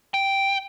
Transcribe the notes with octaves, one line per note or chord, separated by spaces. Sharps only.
G5